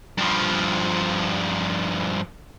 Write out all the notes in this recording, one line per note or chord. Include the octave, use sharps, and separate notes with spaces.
G2 F3